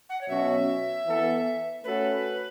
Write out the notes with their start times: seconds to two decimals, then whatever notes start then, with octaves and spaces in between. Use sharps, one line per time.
0.09 F#5
0.21 C#5
0.28 B2 F#3 C#4 F#4 E5
1.06 E3 B3 A4
1.84 A3 C#4 F#4 A4 B4